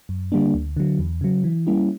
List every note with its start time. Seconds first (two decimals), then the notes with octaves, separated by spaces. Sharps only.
0.09 F#2
0.32 D3 G3 A#3 D4
0.54 D2
0.77 D3 F#3
0.99 E2
1.21 C#3 F#3
1.44 E3
1.67 G3 A#3 C#4 E4